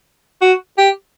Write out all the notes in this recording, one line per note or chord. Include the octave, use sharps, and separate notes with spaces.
F#4
G4